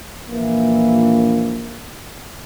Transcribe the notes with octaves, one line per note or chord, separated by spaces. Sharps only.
A#1 E3 A#3